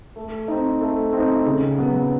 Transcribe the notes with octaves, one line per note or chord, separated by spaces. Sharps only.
A3
C4 D#4
A3
C4 D#4
C#3
F#3 B3